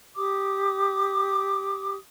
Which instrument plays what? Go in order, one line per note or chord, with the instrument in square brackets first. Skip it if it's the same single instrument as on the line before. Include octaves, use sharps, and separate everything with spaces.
[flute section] G4 D6 D#6